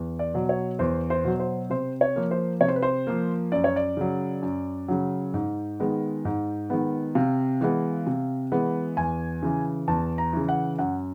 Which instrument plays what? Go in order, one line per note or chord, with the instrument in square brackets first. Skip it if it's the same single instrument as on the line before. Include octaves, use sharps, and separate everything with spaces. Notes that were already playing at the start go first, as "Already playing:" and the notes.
Already playing: [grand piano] E2
D5
B2 F#3
C#5
E2 C5
C5
B2 F#3
C5
C3 C5
C#5
F3 A#3
C5
C3 C#5
C5
B4
C5
F3 A#3
F#2 D5
C#5
D5
C#3 F#3
F#2
C#3 F#3
G#2
D#3 G#3 B3
G#2
D#3 G#3 B3
C3 F5
E3 G#3 B3
C3
E3 G#3 B3
E2 G#5
C#3 E3
E2 A5
A#5
C#3 E3
F#5
F#2 F#5